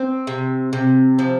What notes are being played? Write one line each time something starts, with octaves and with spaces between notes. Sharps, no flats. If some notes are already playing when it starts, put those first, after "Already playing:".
Already playing: C4 C5
C3
C3
F3